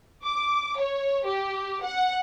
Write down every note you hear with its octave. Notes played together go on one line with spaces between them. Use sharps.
D6
C#5
G4
F#5